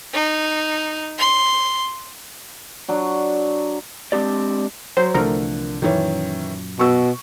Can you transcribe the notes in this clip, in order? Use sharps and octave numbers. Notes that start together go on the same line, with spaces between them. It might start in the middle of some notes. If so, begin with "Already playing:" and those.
D#4
C6
F#3 D4
G#3 C4 D4 G4 D5
F#3 C5
C2 D3 E3 F3 A3 A#4
F#2 A#2 D#3 E3 C#4
B2 C#6 E6